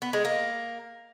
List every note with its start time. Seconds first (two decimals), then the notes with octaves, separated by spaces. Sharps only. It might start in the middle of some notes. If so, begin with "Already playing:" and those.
0.02 B3
0.13 G#3
0.25 A#3